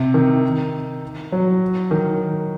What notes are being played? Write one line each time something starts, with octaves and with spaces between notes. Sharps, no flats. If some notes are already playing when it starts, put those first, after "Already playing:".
Already playing: C3
D#3
F#3
D#3